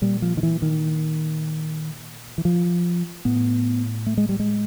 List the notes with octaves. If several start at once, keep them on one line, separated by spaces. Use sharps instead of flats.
A#2 G3
F3
D#3
E3
D#3
E3
F3
A2 B3
A3
G#3
G3
G#3